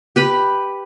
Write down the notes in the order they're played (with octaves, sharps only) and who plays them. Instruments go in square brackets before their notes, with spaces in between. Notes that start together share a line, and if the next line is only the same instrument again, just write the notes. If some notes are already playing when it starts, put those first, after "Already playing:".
[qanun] G4 B4 B5